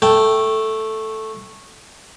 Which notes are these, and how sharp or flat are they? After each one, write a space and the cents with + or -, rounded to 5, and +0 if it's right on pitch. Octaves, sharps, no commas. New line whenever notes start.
A3 +0 G5 +0